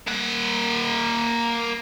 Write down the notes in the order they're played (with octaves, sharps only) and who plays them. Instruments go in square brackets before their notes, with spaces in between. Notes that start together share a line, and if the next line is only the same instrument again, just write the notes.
[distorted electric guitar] A#3 F#5